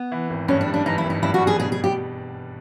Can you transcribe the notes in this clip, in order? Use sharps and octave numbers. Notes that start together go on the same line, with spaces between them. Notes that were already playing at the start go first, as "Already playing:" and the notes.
Already playing: B3
E3
G#1
G2 C#4
D4
G3
D4
E3 D#4
E4
G#1
D#4
G2 E4
F#4
G3
G#4
B2 G#4
G#4
G4